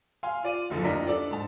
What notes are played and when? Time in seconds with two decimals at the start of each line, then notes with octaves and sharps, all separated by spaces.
0.23 F5 G#5 C6
0.43 F4 D5 D#7
0.70 F#1 F#2 D3 F3
0.84 D1 F2 D4 A#4 D#5 B6
1.07 D4 A4 D5
1.31 G#2 A5